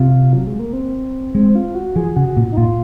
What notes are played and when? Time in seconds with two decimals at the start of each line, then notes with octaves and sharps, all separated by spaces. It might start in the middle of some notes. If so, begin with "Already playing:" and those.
Already playing: C3 F4
0.33 F#3
0.47 G#3
0.59 A#3
0.73 C4
1.34 G#3 C4
1.55 F4
1.75 F#4
1.96 F3 G#4
2.16 C#3 F#4
2.37 A#2
2.52 D#4
2.57 A#2 F4